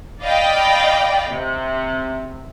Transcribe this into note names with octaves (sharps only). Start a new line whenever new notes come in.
D5 D#5 F5 G5 B5
C3